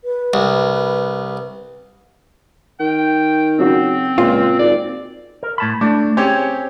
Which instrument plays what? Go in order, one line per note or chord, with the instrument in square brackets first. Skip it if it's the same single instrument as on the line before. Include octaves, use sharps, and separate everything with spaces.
[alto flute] B4
[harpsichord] C2
[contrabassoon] D#3 [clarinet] G5
[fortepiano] C#3 F#3 F#4 [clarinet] C4
[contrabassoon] C#2 [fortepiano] A#2 [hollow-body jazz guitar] F4
[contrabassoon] G#1 [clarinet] D5
[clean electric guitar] A#4
A2 A5 B5
[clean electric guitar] A3 [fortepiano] D4
[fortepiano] C4 C#4 G4 [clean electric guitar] G#4 C#5